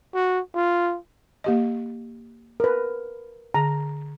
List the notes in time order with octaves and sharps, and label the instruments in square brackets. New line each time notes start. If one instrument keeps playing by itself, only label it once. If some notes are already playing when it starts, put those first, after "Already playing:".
[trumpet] F#4
F4
[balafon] A#3 G4 D#5
[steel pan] A#4 B4
[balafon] D3 [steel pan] A#5